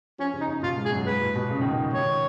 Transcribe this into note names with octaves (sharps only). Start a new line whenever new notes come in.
F3 C#4
C#3
D#4
C#3
B2 F4
G#2
G#4
F#2
G#2 B4
A#2
B2
C#3
D#3
D#3
D#3 C#5